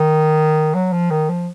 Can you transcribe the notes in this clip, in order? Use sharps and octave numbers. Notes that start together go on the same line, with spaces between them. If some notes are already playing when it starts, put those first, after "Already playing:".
Already playing: D#3
F#3
F3
D#3
F3